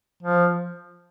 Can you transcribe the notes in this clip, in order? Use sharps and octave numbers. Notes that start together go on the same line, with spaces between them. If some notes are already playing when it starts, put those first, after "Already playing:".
F3